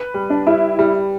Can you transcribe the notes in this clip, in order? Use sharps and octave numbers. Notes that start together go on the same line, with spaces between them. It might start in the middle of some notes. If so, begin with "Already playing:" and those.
Already playing: B4
G3
D4
G3 E4
G3